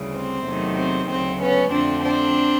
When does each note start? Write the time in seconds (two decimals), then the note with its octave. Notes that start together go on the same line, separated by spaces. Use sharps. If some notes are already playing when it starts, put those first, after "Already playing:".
Already playing: D2 C#3 E3 G3
0.14 C4
0.46 E2 C3 D#3 F#3 A3
0.77 C4
1.09 D2 C#3 F#3 A3 C4
1.40 B3 C#4
1.71 F2 D3 F3 A3 C4 D4
2.02 C4 D4